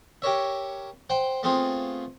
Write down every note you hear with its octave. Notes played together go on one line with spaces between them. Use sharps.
G4 A#4 C#5 E5
C5 F#5 G5
A3 B3 C4 F4 G#4